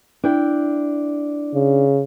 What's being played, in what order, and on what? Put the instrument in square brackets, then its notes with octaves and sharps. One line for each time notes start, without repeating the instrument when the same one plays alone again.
[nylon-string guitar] D4 E4 G5
[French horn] C#3